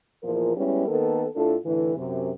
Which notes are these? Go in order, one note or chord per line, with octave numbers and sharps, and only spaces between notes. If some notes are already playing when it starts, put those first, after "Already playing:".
E2 A#2 F3 A#4
G3 G#3 B3 C#4 E4
D#3 A#3 B3 A4
A2 D4 F4 A4
A2 D3 E3
F#2 C3